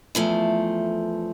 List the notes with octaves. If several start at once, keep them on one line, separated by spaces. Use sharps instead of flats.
E2 F3 A3